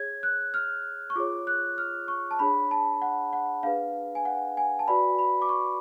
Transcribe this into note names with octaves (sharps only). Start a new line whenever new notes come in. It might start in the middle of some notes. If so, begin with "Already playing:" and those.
Already playing: G#4 C#5 G#6
F#6
F6
C#6
F4 G#4 C#5 D6
F#6
F6
C#6
A5
D4 G#4 C#5 B5
A5
F#5
F#5
D4 G#4 B4 F5
G#5
F#5
G#5
A5
F#4 B4 D5 B5
B5
D6
C#6